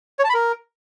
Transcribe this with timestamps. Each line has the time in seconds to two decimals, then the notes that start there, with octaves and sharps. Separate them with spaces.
0.19 C#5
0.24 A5
0.29 B5
0.34 A#4